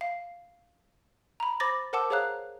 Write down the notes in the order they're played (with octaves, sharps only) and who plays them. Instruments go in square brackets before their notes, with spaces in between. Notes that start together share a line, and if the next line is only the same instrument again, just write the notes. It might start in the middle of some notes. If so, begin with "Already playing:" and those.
[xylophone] F5
A#5 B5
C5 B5 D6 A6 A#6
A#4 C5 F#5 A5 D6 E6
G#4 C5 C#5 F5 A#5 F#6